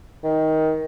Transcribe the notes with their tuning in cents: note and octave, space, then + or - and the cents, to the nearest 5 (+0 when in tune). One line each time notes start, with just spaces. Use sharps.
D#3 +15